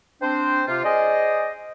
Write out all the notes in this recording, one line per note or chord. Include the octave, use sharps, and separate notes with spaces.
C4 D4 C5
C3 F4
G#4 C5 D5 D#5